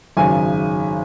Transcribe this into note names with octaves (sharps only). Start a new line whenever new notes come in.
G#1 F#2 C#3 G#5